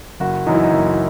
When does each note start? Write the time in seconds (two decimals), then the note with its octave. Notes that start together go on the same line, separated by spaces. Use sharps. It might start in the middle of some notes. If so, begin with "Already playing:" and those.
0.20 F#1 F#4
0.46 F#2 E3 D#4
0.55 E4
0.63 D#4
0.73 F#1